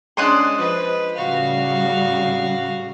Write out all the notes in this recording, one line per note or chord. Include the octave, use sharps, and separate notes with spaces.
G#3 C#4 D4 C6 D#6 F#6
F3 B4 D#5
A2 C#3 G3 F#4 F5